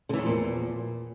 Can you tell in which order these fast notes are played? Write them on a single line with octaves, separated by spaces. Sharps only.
D3 E3 E2 F3 A#2